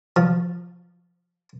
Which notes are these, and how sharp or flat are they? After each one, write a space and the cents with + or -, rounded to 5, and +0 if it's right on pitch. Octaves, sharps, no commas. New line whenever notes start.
F3 +5